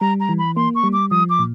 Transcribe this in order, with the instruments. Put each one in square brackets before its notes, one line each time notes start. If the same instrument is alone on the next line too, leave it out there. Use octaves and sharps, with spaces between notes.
[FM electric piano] G3 [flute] A#5
[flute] A#5
[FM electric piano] E3
[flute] B5
[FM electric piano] A#3 [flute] C6
[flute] C#6
[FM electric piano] G3
[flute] D6
[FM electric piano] F3 [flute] D#6
[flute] D6
[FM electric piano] A#2